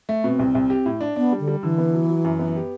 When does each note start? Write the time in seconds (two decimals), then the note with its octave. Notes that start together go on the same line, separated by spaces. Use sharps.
0.09 A3
0.24 B2 C4
0.39 C2
0.55 C2
0.70 G4
0.86 A2
1.01 D4
1.16 B3 D4
1.32 G3
1.40 D3
1.48 G3
1.63 D3 E3
1.78 B3
1.94 F#3
2.09 F#3
2.24 F#2
2.39 B3
2.56 G4